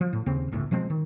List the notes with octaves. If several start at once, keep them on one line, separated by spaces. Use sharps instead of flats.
F3
A2
D#2 C#3 C4
G1 C#2 A2
B2 F3 G#3 C4
D#3